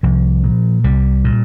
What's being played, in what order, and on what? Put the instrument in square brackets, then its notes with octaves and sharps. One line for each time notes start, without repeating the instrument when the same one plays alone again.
[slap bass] C2 F3
A#2
C2 G3
A#2